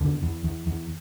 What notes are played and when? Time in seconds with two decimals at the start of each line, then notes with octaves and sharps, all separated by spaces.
0.01 E2 D3
0.23 E2
0.44 E2
0.67 E2